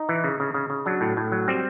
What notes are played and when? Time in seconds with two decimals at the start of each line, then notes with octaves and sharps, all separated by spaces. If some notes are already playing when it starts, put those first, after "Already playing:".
Already playing: D#4
0.09 E3
0.24 C#3
0.40 C#3
0.54 C#3
0.70 C#3
0.86 F#3 D4
1.01 A2
1.17 A2
1.32 F#3
1.48 G3 C4